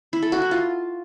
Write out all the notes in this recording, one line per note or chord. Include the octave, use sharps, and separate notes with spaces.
E4
A4
F#4
E4
F4